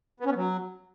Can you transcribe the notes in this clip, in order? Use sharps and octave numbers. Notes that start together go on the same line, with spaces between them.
B3
C#4
B3
F#3